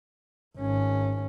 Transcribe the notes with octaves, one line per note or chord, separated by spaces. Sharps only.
G#1 C#4